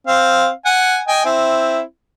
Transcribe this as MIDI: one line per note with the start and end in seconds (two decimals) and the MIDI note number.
0.07 0.49 60
0.07 0.49 77
0.65 1.00 78
0.65 1.00 80
1.08 1.22 75
1.08 1.22 79
1.08 1.22 80
1.25 1.80 60
1.25 1.80 64